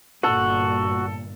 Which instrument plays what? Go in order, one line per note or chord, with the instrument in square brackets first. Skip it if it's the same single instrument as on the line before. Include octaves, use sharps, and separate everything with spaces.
[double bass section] G1 A#2 [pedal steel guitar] F#4 [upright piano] A4